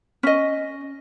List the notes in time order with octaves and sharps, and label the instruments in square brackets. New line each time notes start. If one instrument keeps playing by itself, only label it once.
[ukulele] C#4 D#5